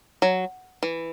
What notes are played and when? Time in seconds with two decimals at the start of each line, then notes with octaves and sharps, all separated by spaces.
0.22 F#3
0.83 E3